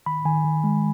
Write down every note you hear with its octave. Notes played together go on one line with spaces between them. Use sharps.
D#3 B5
D#3 G#5
D#3
G#3